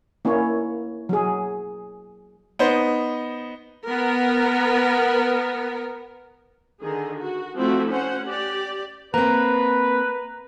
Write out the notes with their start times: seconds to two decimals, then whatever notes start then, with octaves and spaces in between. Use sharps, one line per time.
0.25 A#3 C#4 E4 C#5
1.09 F#3 G#4
2.59 B3 D#4 C5
3.87 B3 A#4
6.81 D3 D#3 G#4
7.18 F#4
7.56 F3 A3 C4 E4 F#4
7.90 C#4 C5 F#5
8.25 G4 D5
9.14 A#3 C4 B4 A#5